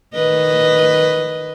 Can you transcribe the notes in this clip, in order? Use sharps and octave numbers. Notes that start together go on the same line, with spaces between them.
D#3 B4 D#5